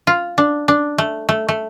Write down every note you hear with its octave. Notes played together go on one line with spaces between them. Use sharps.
F4
D4
D4
A3
A3
A3